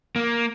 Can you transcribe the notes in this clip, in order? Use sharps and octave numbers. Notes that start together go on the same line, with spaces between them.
A#3